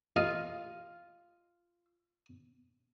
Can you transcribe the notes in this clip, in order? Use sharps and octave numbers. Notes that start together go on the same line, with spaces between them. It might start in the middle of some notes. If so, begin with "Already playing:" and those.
A1 F4 D#5 F5